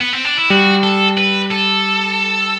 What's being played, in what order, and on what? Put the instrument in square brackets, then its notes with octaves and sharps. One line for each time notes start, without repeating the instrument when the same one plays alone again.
[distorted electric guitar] B3
C4
D4
E4
[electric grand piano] G3 [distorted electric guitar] F#4
[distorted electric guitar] A4
B4
A4